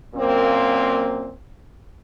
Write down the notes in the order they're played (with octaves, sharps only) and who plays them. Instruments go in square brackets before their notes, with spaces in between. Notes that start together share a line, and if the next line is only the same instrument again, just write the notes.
[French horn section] F#2 A#2 A#3 C4